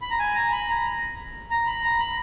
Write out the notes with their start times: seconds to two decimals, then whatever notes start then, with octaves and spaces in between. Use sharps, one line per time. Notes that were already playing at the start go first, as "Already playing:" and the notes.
0.02 B5
0.10 A#5
0.19 G#5
0.35 A#5
0.52 B5
0.69 A#5
1.50 A#5
1.66 B5
1.83 A#5
1.99 B5